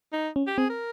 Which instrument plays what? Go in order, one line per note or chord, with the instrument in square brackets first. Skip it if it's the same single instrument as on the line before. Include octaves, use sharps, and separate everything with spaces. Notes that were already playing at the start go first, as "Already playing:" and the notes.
[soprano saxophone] D#4
[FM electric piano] C#4
[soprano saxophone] G4
[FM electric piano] C4 [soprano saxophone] G#4
[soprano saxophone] A#4